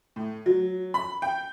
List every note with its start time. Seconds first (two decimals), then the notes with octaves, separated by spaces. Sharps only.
0.16 A2
0.46 F#3
0.94 B5
1.22 G5